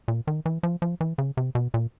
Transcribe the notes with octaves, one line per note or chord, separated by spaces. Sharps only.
A#2
D#3
E3
F3
F3
E3
C#3
C3
B2
A#2